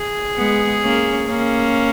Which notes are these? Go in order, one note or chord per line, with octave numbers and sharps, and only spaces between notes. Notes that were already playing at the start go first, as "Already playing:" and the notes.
Already playing: G#4
G#3 B3
A#3 C#4
A#3 C#4